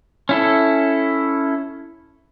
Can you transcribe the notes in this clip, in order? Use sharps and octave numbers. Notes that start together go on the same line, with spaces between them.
C#4 E4 A4